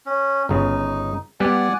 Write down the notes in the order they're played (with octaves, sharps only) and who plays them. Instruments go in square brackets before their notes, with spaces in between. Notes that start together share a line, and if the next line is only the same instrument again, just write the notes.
[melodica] C#4
[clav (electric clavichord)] G1 C#3 [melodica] D#4
[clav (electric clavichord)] G3 B3 G4 [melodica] D5 F#5 G#5